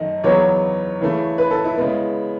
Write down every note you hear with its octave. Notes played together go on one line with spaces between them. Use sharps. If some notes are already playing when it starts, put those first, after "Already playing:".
Already playing: F#2 D#3 A3 D#5
E2 C#3 F#3 B3 C#5
C#3 E3 A3
B4
A4
E4
C#3 G#3 B3